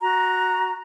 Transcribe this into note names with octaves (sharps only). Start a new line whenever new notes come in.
F#4 A#5